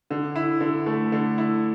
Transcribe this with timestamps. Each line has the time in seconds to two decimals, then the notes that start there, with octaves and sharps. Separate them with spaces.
0.10 D3
0.36 E4
0.60 D3
0.86 A3
1.12 D3
1.38 E4